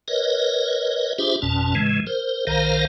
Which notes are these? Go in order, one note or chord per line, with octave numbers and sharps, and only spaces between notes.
A#4 B4 C#5 D#5
D4 F4 G4 G#4 C5 E5
G1 F2 B2 C#4 A5
A2 C#3 E3 G#3
A#4 C5
B1 D#3 A#4 C5 F5 A#5